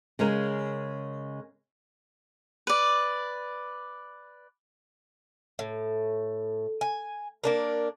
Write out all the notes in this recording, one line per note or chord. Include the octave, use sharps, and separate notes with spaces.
C#3 G#3 C#4 A#4
B4 D5
A2
G#5
A#3 D4 A#4